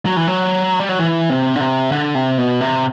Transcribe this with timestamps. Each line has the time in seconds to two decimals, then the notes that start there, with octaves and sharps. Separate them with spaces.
0.06 F#3
0.17 E3
0.28 F#3
0.79 G3
0.89 F#3
0.99 E3
1.30 C3
1.55 D3
1.60 C3
1.92 D3
2.15 C3
2.38 B2
2.61 C3